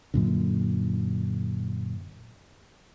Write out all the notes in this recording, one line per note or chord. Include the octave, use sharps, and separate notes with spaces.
F#2 A#2 D3